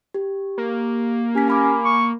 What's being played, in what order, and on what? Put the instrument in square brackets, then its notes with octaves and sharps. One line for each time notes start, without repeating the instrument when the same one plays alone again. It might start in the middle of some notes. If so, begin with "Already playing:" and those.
[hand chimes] G4
[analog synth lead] A#3
[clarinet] C#4 [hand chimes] G4 B6
[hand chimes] G#5 B5 D6
[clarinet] C#6